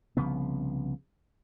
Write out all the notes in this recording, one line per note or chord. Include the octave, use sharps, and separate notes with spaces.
C2 C#3 F3 B3